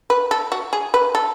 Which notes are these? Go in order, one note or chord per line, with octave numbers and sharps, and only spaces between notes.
B4
A4
F#4
G#4
B4
A4